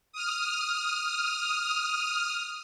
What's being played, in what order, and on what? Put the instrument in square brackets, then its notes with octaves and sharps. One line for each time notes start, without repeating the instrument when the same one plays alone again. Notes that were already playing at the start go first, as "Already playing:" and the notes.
[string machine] D#6 F6